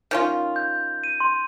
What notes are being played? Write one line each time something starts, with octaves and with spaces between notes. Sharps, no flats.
D#3 C#4 F4
G6
D#7
C6